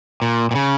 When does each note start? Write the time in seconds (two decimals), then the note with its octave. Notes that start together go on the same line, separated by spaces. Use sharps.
0.22 A#2
0.51 A#2
0.55 C#3